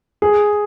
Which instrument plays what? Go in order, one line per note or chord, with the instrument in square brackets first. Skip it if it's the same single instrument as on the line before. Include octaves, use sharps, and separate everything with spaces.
[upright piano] G#4